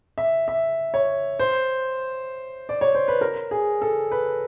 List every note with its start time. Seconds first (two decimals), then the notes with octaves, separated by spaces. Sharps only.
0.18 E5
0.48 E5
0.94 C#5
1.39 C5
2.69 D5
2.81 C#5
2.95 C5
3.08 B4
3.21 A#4
3.51 G#4
3.82 A4
4.11 B4